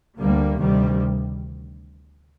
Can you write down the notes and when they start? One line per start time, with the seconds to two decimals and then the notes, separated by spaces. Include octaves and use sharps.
0.17 D2 D3 G3 A#3
0.58 D2 C3 D#3 G3